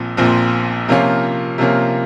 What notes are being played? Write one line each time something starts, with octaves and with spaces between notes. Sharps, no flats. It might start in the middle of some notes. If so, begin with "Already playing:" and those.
Already playing: A#1 A#2 F3 C4
A#1 A#2 F3 C4
C3 F3 A#3 C#4 F4
C3 F3 A#3 C#4 F4